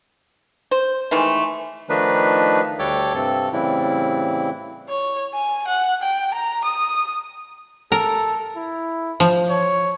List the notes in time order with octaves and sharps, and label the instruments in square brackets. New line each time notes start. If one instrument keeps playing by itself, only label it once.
[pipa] C5
D#3 E3 G#3 A3
[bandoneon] D#3 F3 A3 D4 D#4 B4
D2 G3 A4 C#5 G5 D6
G2 C3 C4 A4
A2 C#3 E3 G3 C4 E4
[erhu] C#5
G#5
F#5
G5
A#5
D#6
[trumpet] A4 [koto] A#4
[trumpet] E4
[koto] F3
[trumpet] C#5